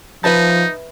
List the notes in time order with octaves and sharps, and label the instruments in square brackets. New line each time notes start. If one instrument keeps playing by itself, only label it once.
[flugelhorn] F3 [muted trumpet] D#4 [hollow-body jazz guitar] B4 E5 A5